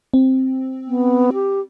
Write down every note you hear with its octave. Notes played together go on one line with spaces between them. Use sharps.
C4
B3
G4